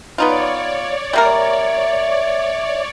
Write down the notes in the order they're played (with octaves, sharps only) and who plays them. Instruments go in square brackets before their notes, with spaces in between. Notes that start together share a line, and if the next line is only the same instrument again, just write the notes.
[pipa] B3 D#4 F4 [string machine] C#5 D5
[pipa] G3 A#3 A#4 [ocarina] E5